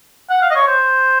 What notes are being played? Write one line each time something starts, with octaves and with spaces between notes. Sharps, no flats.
F#5
F5
D#5
C#5
C5